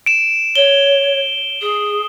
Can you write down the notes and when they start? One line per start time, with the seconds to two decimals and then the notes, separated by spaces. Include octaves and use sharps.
0.06 D7 E7
0.56 C#5 G7
1.61 G#4